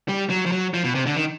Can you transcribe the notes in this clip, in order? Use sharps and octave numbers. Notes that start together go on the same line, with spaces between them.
G3
F#3
F3
F#3
F3
B2
C3
D3
D#3